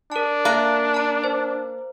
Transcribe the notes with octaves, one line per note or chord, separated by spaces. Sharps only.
D4 A#4 A5
A#3 E5 F#6 A6
A5 A#5
C5